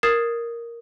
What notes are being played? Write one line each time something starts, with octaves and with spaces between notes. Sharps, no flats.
A#4 D#6 G#6 A6 C7 E7